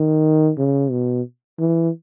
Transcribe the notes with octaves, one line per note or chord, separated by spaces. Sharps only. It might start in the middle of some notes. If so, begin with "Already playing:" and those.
Already playing: D#3
C#3
B2
E3